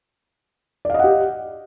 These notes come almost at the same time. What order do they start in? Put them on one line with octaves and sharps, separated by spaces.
D5 F5 D#5 F#5 G4